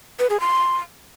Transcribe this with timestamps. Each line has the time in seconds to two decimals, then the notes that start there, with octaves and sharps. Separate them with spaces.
0.19 B4
0.30 G#4
0.40 C6